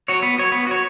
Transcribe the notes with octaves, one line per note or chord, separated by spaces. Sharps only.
F#4 C#5
B3
F#4 C#5
B3
F#4 C#5